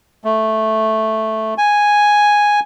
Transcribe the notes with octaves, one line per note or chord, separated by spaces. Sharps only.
A3
G#5